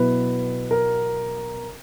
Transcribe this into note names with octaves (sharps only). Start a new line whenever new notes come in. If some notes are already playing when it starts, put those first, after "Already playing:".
Already playing: B2 F#3 B3 E4 B4
A#4